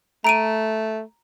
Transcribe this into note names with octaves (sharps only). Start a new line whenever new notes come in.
A3 A#5 D7 D#7